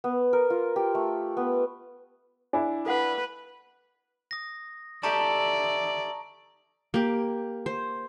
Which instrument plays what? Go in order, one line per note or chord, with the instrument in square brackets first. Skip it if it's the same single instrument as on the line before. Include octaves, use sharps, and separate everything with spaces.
[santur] B3
A#4
F4
G4
A3
B3
[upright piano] D4 E4 [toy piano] G#5
[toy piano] A4 F5 F#5 [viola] B4
[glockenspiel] D#6 A#6
[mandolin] G4 A4 E5 [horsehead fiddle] D5 [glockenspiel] A5 A#5 C#6
[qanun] A#3 G4
C5